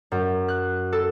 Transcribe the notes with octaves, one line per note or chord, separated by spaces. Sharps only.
F#2
F#6
A4